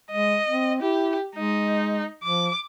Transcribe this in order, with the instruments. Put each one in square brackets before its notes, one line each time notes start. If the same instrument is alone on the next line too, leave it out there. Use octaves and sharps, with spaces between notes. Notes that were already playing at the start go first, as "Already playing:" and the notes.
[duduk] G#3 [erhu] D#5
[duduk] C4
[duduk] E4 [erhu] G4
[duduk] G#3 [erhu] D#4
[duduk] F3 [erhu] D6